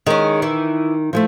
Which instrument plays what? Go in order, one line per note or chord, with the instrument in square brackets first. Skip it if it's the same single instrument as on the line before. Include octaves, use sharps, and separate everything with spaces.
[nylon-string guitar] D#3 [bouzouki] G#3 C#4
[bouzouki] E3
[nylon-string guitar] F3 G#3 A3